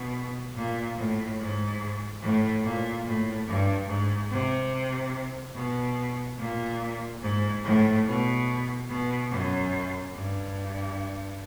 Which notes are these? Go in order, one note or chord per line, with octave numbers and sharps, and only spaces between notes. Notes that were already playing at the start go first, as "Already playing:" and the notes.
Already playing: B2
A#2
A2
G#2
A2
A#2
A2
G2
G#2
C3
B2
A#2
G#2
A2
B2
B2
F#2
G2